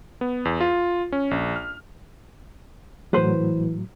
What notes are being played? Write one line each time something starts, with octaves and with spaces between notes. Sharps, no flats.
B3
E2
F4
C#4
A#1
F6
A2 E3 F#3 B4 C5